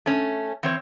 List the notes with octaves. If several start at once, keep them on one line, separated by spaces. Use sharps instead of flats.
A3 C#4
E3 C4 C#5